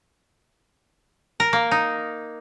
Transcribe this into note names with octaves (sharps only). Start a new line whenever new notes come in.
A#4
A#3
D#4